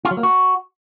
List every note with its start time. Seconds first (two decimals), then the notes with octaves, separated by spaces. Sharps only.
0.05 F4
0.11 F#3
0.17 A#3
0.23 F#4